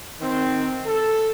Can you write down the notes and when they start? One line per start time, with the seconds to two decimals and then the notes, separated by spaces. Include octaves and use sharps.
0.20 D#3 C4
0.87 A4